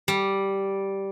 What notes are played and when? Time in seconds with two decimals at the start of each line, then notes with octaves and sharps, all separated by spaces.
0.08 G3